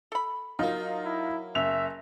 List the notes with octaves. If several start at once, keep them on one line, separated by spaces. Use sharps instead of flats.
A4 B5
F#3 A#3 D#4 F4
E4
F#1 E5 F7